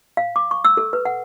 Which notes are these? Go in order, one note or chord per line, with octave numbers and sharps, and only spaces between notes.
F5
D6
C#6
E6
A4
B4
F#5